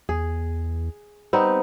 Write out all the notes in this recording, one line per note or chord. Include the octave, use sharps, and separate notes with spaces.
E2 G#4
G3 B3 C4 D#4